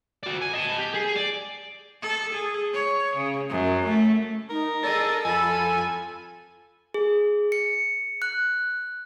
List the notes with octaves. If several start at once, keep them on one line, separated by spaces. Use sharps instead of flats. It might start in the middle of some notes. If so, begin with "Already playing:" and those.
F#4 D5
G#5
D#5 A5
G4
G#4
D5
A4
G#4
C#5
C#3
F#2
A3
D#4 A#4
G#4 A4 D#5 E6
F2 A4 G#5 B5
G#4
C#7
F#6